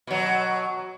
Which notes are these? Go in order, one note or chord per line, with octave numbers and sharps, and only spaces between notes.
B2 F#3